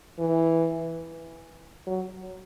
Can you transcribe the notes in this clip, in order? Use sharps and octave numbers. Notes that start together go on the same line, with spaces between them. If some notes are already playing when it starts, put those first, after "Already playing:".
E3
F#3